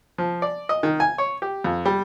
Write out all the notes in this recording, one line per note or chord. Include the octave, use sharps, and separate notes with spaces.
F3
D5
D#5
D#3
G#5
C#5
G4
F2
G3